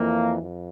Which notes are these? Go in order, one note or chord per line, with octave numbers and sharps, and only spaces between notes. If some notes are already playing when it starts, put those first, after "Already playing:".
Already playing: F2 E3 A#3
F2